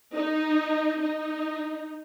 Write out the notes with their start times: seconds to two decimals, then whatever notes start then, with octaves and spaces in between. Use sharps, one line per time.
0.14 D#4
1.01 D#4